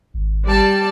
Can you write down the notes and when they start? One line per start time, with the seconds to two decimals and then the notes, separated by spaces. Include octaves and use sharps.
0.14 G#1
0.47 G3 D5 A5